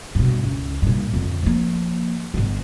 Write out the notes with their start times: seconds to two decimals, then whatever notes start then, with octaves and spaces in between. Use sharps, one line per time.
0.15 G2 B2
0.44 C#2 E3
0.82 G2 A#2
1.14 F2 D3
1.42 F3 A#3
2.34 G1 D3